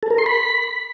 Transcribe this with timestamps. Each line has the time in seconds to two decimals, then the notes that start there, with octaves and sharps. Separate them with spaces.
0.03 A4
0.10 A#4
0.18 C6
0.26 B5